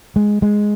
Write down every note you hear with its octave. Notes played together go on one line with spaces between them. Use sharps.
G#3
G#3